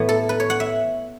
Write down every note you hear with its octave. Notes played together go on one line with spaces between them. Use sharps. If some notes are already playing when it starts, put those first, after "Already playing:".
Already playing: A2 E3 B3
A4
B4
C#5
F#5
E5